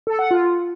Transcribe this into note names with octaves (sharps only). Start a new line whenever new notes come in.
A4
F#5
F4